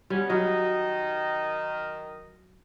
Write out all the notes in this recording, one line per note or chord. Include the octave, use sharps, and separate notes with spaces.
G3 B3 C#4
D#3 F#3 D#5